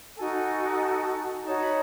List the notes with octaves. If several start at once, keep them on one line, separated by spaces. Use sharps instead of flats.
D#4 F#4 A4 G#5
D#4 F#4 C#5 A5
B5